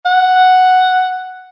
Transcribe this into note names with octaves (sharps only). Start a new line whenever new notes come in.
F#5